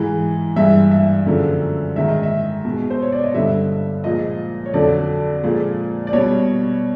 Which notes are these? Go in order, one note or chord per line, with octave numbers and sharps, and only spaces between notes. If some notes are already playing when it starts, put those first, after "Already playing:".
Already playing: G#2 E3 G#3
G2 E3 G#3 E5
E5
F#2 D3 F3 G#3
G#2 D#3 G#3 E5
D#5
E5
B2 G#3
C5
C#5
D5
D#5
G2 D3 G3 E5
A#2 F3 G#3 D#5
C#5
F2 D3 F#3 D5
A#2 F3 G#3
D5
B2 G3 C#5